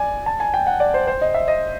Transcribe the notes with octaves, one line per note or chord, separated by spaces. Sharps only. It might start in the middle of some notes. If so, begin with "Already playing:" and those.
Already playing: D5 G#5
A5
G#5
G5
F#5
D5
C5
C5
D#5
E5
D#5